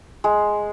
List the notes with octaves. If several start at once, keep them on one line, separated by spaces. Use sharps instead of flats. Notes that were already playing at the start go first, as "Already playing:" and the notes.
G#3